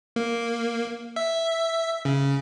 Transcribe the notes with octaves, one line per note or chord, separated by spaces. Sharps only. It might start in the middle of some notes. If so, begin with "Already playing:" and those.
A#3
E5
C#3